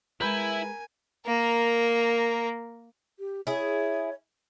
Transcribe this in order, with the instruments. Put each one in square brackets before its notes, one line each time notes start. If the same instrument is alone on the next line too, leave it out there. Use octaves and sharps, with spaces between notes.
[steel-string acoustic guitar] G#3 B4 [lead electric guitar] E4 [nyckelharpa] A#4 G#5 [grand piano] A#5 B5 G6
[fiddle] A#3 A#4
[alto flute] G4
[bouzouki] E4 G#4 [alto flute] C#5